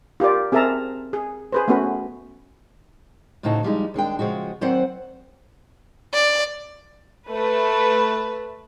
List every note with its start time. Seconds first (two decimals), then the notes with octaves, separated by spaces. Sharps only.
0.20 F4 G4 A#4 D5
0.52 C4 G#4 A#4 E5 A5 A#5
1.13 G#4
1.53 G#4 B4 C5
1.68 A3 B3 C#4 F#4 B4
3.43 D2 A2 C#3 D#4 F#4 A5
3.63 F3 G3 G#3 D#4
3.94 D#2 G#3 D4 G5
4.19 C#3 F3 G#3 F#4
4.61 D#2 F#3 C4 C5 D5 F#5
6.14 D5
7.29 A3 B4